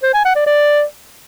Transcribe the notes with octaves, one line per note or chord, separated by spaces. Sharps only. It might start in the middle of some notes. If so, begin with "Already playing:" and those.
C5
G#5
F#5
D5
D5